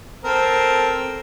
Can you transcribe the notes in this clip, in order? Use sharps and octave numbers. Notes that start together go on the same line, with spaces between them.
C4 A4 A#4